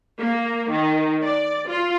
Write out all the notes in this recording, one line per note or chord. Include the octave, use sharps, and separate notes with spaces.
A#3
D#3
D5
F4